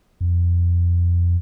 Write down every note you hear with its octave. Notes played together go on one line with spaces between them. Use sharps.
F2